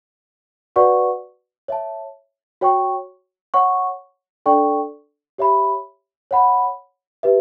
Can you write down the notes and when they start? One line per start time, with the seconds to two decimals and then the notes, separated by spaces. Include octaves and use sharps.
0.76 F#4 B4 D5 F#5 C#6
1.68 C#5 E5 A5
2.61 F#4 C#5 G5 C#6
3.54 C#5 F#5 C#6
4.46 D4 A4 D5 G5 C#6
5.38 G4 C#5 E5 B5
6.31 C#5 F#5 B5
7.23 G4 B4 E5